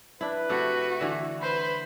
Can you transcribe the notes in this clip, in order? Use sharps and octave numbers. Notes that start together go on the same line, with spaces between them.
D4 E4 B4
C3 A3 F#4
D3 E3
B4 C5 B5